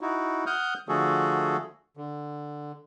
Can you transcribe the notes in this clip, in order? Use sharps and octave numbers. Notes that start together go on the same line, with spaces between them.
D#4 E4 F#4
F#5 D#6 F6 G6
D3 F3 A3 F#4 G#4 A4
D3